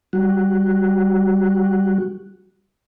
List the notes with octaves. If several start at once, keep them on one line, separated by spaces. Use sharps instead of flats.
G3 F#4